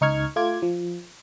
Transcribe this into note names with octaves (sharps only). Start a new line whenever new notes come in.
C#2 D#4 C#6 F6 G#6
A3 F4 D6 G#6
F3